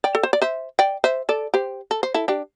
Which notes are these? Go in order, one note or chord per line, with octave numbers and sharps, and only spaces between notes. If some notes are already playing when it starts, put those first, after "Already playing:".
D5 G5
A4
C5
D5
C5 E5
D5 G5
C5 E5
A4 D5
G4 C5
A4
C5
E4 A4
D4 G4